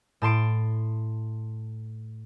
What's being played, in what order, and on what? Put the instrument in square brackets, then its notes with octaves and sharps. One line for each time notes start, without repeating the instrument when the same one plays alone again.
[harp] A2 A5 C6 D7